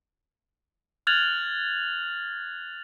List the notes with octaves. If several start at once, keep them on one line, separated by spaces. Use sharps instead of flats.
F6 F#6 G#6 A6 F7 F#7